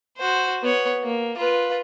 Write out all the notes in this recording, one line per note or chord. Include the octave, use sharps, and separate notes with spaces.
F#4 C5
B3 C#5
A#3
F4 B4